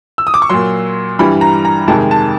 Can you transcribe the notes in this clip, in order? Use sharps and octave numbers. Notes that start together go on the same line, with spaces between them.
E6
D#6
D6
C#6
A#2 F#3 C6
G2 E3 G3 B5
A#5
A#5
F2 C3 D#3 G#3 A5
A5